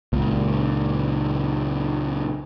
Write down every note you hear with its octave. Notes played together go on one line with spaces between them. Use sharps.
C#2 A#2